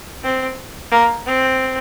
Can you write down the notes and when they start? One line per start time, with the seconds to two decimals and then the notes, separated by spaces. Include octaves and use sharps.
0.23 C4
0.91 A#3
1.26 C4